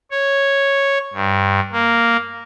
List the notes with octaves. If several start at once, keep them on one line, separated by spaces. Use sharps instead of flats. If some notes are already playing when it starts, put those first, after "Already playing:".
C#5
G2
A#3